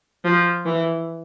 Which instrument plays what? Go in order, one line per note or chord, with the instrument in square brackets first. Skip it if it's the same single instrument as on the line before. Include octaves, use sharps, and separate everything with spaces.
[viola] F3
E3